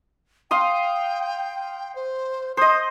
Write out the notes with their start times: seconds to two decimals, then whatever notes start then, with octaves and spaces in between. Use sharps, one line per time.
0.51 F5 G5 C6 D#6
1.95 C5
2.57 C5 D#5 D#6